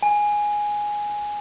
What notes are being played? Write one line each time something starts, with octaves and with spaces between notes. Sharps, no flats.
G#5